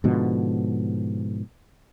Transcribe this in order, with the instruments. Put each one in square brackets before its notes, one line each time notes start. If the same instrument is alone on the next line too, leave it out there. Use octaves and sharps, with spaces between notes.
[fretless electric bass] G#2 B2 D3 F3